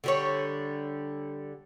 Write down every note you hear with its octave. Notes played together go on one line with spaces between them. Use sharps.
D3 G3 C#5